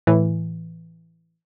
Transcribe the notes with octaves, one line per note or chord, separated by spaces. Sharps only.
A2 E3